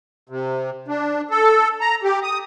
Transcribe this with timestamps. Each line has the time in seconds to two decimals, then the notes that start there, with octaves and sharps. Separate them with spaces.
0.29 C3
0.88 D4
1.31 A4
1.81 A#5
2.03 G4
2.23 D#6